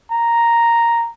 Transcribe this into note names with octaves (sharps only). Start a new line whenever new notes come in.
A#5